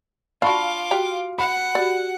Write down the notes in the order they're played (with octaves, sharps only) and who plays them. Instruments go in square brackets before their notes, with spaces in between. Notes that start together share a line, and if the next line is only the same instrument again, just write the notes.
[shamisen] D4 F#4 [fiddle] F4 D6 [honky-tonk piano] F5 [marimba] A5 B5 C#6
[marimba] F#4 [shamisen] G4 G5 A#5
[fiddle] F#5 [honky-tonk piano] B5
[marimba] F#4 G4 [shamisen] D5